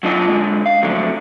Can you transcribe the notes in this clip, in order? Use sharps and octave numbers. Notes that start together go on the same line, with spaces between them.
F#3 D4 F4 D#5
D3 G#3
F5
F2 A2 D3 F#3